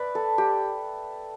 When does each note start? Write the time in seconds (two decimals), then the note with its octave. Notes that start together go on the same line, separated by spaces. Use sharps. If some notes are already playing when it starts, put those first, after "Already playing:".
Already playing: B4 D5 E5
0.15 A4
0.38 G4